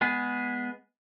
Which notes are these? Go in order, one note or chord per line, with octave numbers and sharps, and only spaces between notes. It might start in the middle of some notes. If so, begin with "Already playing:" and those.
G#3 B3 G#4